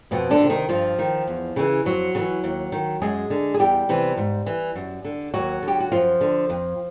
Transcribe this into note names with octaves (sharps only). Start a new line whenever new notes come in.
F2 B2 B3
D3 D4
D#3
C3
D#3 D#4
G2 F3 F4
D#3
E2
C#3 E3
F2 F#3 F#4
C#3
E3
D#2
D#3
F#2 G#3 G#4
D3
G#4
E2 G3 G4
C3 E3
G#2
E3
F#2
D3
D#2 F#3 F#4
D3
G4
F#4
F#2 F3 F4
D3
F2